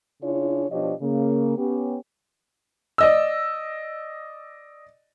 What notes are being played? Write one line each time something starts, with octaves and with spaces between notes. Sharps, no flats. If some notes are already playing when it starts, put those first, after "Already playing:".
C#3 D4 E4 F4 G#4 C#5
B2 F3 D4 G4 C#5 D#5
C#3 A#3
B3 C#4 G4
D5 D#5 E6